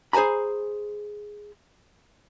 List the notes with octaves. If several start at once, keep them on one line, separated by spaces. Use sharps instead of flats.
G#4 C5 G#5 A#5 B5